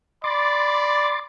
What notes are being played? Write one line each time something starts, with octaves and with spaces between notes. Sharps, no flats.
D5 B5 C6 D6 A6